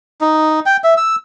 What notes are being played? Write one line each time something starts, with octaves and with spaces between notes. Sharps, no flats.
D#4
G5
E5
E6